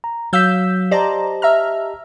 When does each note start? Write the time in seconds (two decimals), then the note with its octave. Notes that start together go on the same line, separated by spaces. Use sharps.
0.04 A#5
0.33 F#3 F5 E6 G6 B6
0.91 G4 C5 D5 D#5 A5 A#5
1.42 E5 A#5 F6